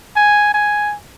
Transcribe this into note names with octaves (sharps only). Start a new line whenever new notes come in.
G#5
G#5